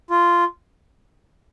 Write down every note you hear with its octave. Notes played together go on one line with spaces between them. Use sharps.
F4